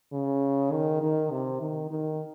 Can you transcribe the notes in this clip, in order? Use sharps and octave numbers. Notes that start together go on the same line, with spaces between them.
C#3
D#3
D#3
C3
D#3
D#3